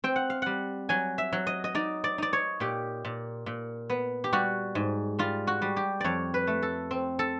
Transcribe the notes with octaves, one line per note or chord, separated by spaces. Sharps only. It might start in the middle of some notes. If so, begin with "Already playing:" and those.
C4 G5
F#5
F5
G3 F#5
F#3 G#5
E5
F#3
D#5
D#5
D#4 D5
D5
D#4 D5
C#5
A#2 G4
A#2
A#2
B3
G4
G3 F#4
G#2
G3 F4
F#4
G3
G4
F2 C#5 D5
B4
A3
A4
C4
A4